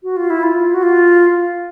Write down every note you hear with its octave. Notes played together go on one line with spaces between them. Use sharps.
F#4
F4
E4
F4
F#4
F4